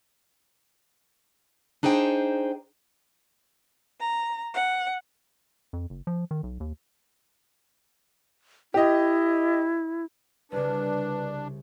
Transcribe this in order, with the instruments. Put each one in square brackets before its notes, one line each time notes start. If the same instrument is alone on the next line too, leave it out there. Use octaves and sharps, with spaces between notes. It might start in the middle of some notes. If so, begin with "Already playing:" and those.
[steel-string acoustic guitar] D4 D#4 G#4 C5 G5
[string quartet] A#5
F#5
[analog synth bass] F2
F#1
F3
D#3
B1
D#2
[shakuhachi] E4 [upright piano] G4 D#5
[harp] C2 C#3 [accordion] D4 [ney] B4